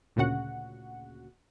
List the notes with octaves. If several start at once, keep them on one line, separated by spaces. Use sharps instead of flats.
D2 A#2 C#3 F#4 F#5